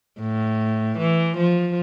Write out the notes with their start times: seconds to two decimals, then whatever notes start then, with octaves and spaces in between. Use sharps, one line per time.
0.20 A2
0.98 E3
1.37 F3